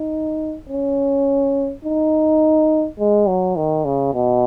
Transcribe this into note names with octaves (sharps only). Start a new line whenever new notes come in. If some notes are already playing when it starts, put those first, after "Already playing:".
Already playing: D#4
C#4
D#4
G#3
F#3
D#3
C#3
B2